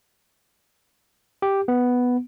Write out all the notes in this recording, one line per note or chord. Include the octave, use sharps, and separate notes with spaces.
G4
B3